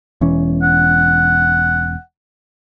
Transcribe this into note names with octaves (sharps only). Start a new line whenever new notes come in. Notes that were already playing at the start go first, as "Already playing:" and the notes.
E1 E3 C#4
F#5